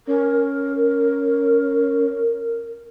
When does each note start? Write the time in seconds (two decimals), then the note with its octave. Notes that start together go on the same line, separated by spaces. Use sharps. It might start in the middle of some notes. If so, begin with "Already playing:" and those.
0.07 C#4 A#4